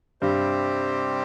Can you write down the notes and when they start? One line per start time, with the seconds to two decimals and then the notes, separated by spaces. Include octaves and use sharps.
0.21 G2 C3 G3 C4 G4 C5